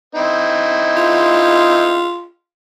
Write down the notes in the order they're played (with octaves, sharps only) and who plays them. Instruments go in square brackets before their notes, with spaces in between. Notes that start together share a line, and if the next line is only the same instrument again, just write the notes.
[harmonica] C4 D#4 E4
[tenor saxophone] F4